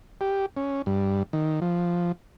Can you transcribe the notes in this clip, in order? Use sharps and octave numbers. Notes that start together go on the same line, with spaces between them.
G4
C#4
G2
D#3
F3